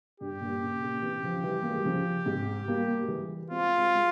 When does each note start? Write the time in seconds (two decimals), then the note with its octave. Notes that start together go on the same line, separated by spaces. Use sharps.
0.20 G2 G4
0.41 G2 A#2
0.62 A#2 C#3
0.82 A#2 C#3
1.02 C3 E3
1.23 C#3 F3
1.43 E3 G3
1.62 A#3
1.70 G#3
1.77 G3
1.85 C#3 F3
2.26 G#2 C3
2.68 G3 A#3
3.03 G#3
3.08 E3 G3
3.50 G#3 C4 F4
3.77 G#3 C4
3.95 G#3